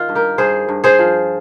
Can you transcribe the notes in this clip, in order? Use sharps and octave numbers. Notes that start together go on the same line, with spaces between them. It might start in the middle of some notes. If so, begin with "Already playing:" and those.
Already playing: D#3 F4
G2
G4 A#4
G2 G#4 C5
G2
G#4 C5
F3